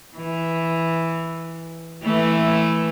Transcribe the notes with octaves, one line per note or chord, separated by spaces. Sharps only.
E3
E3 A3